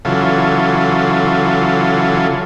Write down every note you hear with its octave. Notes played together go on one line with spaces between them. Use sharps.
C#3 E3 F#3 F4 A4